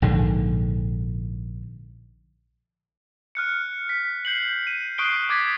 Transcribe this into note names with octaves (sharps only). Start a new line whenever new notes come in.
A#1 G#2 D3
F6 F#6 C#7
B6
G6 C7 F#7
D#7
C#6 D#6 F#6 C7 D7 G7
D6 G#6 A6 B6